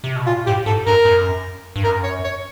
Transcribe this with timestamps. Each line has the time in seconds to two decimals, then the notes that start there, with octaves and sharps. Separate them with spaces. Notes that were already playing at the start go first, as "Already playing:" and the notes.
0.04 C3
0.16 B2
0.27 A#2 F4
0.46 A2 G4
0.66 G#2 A4
0.86 G2 A#4
1.05 F#2
1.76 G2
1.84 F#2 A#4
2.04 C#5
2.24 C#5